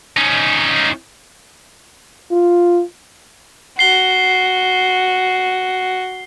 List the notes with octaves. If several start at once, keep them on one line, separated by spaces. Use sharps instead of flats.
C#4 D#4
F4
F#4 C7 G7